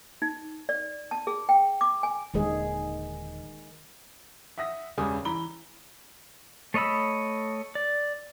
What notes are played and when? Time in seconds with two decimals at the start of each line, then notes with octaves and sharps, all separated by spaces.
0.22 D#4
0.69 D5
1.11 A5
1.27 G#4
1.49 G5
1.81 D6
2.03 G#5
2.34 D#1 D3 D#3 G#3 G#4
4.58 E5 F#5 D#6 A#6
4.97 E1 C#2 C#3 G3 G#5 D#6
5.25 E3 A#5 B5 G7
6.74 A3 C#5 D#5 B5 E6
7.75 D5